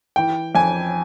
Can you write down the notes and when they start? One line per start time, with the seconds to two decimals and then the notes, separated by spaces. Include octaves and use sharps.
0.16 E3 G5
0.55 F2 G#5